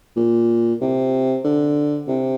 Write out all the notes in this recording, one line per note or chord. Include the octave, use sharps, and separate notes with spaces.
A#2
C3
D3
C3